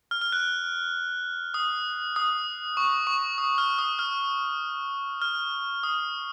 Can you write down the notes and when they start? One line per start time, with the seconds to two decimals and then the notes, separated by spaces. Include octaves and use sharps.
0.11 F6
0.21 F6
0.32 F#6
1.54 D#6
2.16 D#6
2.77 C#6
3.07 C#6
3.38 D#6
3.58 F6
3.79 D#6
3.99 F6
5.22 F6
5.83 D#6